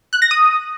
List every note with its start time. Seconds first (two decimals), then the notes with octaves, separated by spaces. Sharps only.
0.13 F#6
0.22 A#6
0.31 D#6